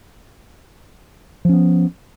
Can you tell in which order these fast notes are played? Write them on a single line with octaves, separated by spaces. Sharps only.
F3 C#4 B3